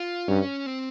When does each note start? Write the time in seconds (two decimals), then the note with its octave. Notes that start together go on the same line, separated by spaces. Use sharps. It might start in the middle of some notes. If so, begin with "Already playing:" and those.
Already playing: F4
0.28 G2 C#4
0.66 C4